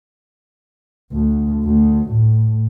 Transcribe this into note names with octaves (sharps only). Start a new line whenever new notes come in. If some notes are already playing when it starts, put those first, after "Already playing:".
D2
D2
A2